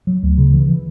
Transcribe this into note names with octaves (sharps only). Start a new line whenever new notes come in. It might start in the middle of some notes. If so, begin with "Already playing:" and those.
F#3
D2
C#3
E3
E3